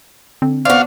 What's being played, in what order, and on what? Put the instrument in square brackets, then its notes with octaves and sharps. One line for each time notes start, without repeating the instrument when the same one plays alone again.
[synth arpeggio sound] D3 [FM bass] C4
[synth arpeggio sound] B3 C5 [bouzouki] D4 F#4 [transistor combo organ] F5